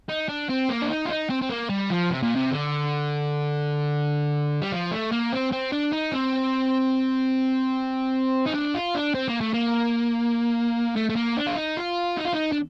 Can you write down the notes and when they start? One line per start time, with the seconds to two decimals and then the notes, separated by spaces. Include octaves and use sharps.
0.09 D#4
0.29 D4
0.49 C4
0.69 A#3
0.82 D4
0.89 D#4
1.05 F4
1.09 D#4
1.29 C4
1.42 C4
1.49 A#3
1.70 G3
1.90 F3
2.10 C3
2.22 A#2
2.35 C3
2.50 D3
4.62 G3
4.72 F3
4.91 A3
5.12 A#3
5.32 C4
5.52 C4
5.73 D4
5.93 D#4
6.13 C4
8.47 D#4
8.55 D4
8.75 F4
8.95 D4
9.14 C4
9.28 A#3
9.41 A3
9.54 A#3
10.96 A3
11.10 A3
11.16 A#3
11.37 D4
11.47 F4
11.56 D#4
11.77 F4
12.17 D#4
12.25 F4
12.34 D#4
12.52 D4